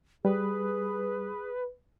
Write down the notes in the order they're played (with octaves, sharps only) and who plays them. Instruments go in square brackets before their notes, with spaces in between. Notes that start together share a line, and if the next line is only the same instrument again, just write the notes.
[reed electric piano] G3 [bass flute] G#4 [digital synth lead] B4